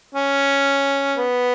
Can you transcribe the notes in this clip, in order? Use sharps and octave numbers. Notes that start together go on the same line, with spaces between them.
C#4
B3